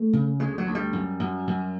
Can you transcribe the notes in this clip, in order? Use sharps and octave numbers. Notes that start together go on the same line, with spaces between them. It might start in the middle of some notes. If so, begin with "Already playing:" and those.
Already playing: A3
C#3
D2 G#3
F#3
D2
G3
F#2
F#2
F#2